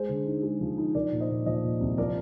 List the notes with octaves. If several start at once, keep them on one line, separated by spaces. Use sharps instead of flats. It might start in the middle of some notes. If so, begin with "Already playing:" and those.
Already playing: G#3 G#4 C5
D3
D#4
G#3
F3
D#4
F3 A#4 D5
A#2
C5 D#5
A#2
F3 C5 D#5
A#2
C2
F3 A#4 D5